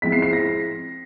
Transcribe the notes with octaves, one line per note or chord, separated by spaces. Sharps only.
F3 G#3 C4 E4 B6
C7
C7
A#6